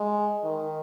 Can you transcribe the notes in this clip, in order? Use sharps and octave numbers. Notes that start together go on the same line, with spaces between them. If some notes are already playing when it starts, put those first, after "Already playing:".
Already playing: G#3
D#3